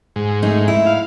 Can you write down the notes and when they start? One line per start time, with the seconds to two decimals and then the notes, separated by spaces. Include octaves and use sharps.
0.16 G#2
0.43 A3 D#4
0.68 E4
0.86 F5